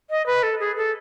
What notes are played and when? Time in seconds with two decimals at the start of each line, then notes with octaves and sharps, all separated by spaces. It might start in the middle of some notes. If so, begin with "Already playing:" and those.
0.10 D#5
0.26 B4
0.43 A4
0.60 G#4
0.77 A4